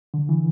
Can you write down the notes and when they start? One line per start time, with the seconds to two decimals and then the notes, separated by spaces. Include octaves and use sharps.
0.14 D3
0.29 E3